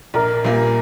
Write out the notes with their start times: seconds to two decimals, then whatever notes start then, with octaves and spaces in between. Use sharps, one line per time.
0.14 A#1 A#4 D5
0.44 A#2 G3 A#3